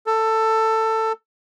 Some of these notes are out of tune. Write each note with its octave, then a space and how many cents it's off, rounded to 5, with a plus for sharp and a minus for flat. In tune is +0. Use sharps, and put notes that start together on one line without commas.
A4 +15